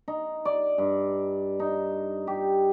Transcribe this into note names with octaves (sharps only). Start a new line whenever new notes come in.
D#4
D5
G2
D#4
G4